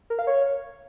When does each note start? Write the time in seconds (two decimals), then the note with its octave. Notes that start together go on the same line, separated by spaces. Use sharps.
0.10 A#4
0.19 F5
0.27 C#5